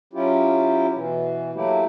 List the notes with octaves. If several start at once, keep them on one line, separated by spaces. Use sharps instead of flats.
F#3 C#4 E4 F4 G4
B2 E3
F#3 A3 A#3 E4 G4